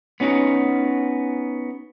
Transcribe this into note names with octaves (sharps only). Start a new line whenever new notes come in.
B3 C#4 D#4 F#4